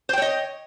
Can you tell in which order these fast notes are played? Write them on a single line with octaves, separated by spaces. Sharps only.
C5 G5 C#5 D#5